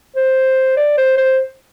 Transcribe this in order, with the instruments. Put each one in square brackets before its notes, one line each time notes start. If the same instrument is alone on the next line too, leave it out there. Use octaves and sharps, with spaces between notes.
[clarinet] C5
D5
C5
C5